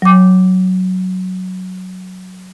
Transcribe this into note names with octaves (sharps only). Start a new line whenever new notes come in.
F#3 D6